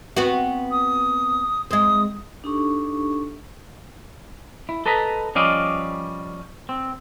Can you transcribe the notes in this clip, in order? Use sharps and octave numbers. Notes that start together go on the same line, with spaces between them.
B3 C4 F#4
D#6
G#3 C4 D#6
D4 D#4 G4 A4 C#6
E4
A4 B4 D#5 A#5 B5
F3 G3 C#4 D5 D#5 F5
C4